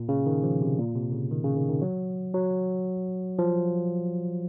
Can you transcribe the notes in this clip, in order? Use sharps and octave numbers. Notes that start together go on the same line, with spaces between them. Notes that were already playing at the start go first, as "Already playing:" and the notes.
Already playing: A#2
C#3
D#3
F3
C3
A#2
C3
C#3
D#3
C#3
D#3
D#3
F#3
F#3
F3